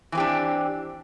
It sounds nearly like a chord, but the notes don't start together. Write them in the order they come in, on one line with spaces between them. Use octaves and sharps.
E3 C4 G4 D4